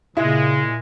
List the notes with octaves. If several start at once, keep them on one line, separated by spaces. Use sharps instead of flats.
A#2 C#3 G#3 E4